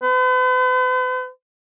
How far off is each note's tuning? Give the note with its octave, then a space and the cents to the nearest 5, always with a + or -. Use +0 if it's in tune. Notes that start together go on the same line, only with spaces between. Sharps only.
B4 +45